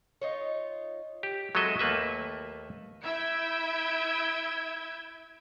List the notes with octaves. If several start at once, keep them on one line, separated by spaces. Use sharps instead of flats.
D#4 F4 C#5
G4
F#3 G#3 C4 A4 D#5 E5
D#2 A3 A#3 B4 E5
E4 E5 E6 G6 G#6 D7